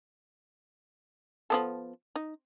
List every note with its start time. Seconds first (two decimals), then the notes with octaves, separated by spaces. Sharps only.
1.50 F3 B3 A4
2.16 D#4